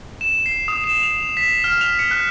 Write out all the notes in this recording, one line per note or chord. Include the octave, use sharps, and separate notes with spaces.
E7
C7
D#6
E7
F7
B6
F6
F7
C#7
F#6